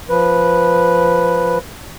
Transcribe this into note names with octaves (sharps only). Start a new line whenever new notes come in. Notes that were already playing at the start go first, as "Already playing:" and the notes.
F3 B4